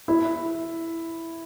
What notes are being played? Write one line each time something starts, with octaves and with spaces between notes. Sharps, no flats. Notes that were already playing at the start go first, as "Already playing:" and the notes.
E4